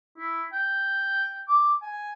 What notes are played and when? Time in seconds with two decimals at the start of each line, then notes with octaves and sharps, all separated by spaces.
0.18 E4
0.53 G5
1.48 D6
1.82 G#5